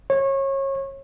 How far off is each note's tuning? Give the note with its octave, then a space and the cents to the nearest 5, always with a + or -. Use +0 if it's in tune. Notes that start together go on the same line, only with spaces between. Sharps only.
C#5 -25